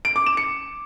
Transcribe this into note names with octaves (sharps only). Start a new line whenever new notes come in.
D7
D6
E7
C#7